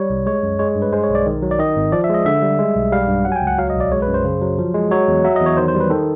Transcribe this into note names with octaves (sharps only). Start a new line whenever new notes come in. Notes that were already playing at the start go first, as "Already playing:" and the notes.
Already playing: G3 C#5
C2
G#3 C#5
F#2
G#3 C#5
G2
B4
G#3 C5
C#5
B1
D5
D#3
F#3
D5
D#3 D#5
G#1
F3 D5
E5
G#3 D#5
D3 E5
G3
G#3
B1
G3 F5
G2
F#3 F#5
G#5
G5
C#2
F#5
F#3 F5
D#5
B1
D5
G#3 C#5
B4
F#2
C5
C#3
F#3
F3
G#3
F#3 C#5
E2
F#3 E5
D#5
E2
C#5
D#3 C5
C5
G3
B4
D#3 A4